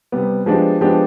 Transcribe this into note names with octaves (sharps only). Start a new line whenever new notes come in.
C3 G3 B3
F3 G#3 B3 D4 G4
F3 G#3 B3 D4 G4